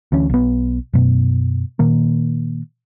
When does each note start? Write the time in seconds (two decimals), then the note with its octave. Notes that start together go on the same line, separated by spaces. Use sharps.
0.12 D2 E3 C#4
0.30 B1 B3
0.93 F#2 B2
1.79 A#2 D#3 A#3